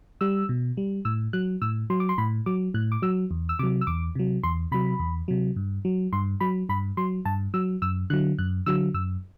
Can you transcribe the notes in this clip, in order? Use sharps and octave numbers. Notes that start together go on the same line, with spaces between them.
G3 E6
B2
G3
A2 E6
F#3 F#6
A2 E6
F#3 C6
D6
C6
A2 B5
F#3 D6
A2 F#6
D6
F#3 E6
E2
E6
C3 F#3 D6
E6
E2 D6
C3 F#3
E2 C6
C3 F#3 B5
E2
C3 F#3
G2
F#3
G2 C6
F#3 B5
G2 B5
F#3 C6
G2 A5
F#3 E6
F#2 E6
D3 F#3 F#6
F#2 F#6
D3 F#3 E6
F#2 E6